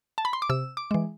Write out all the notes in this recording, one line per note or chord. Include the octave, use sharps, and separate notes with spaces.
A5
B5
C6
D6
C3 E6
D6
E3 G#3